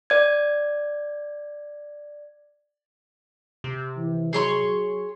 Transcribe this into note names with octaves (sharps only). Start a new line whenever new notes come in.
D5 G#6
C3
E3
F#3 G#4 C#5 C6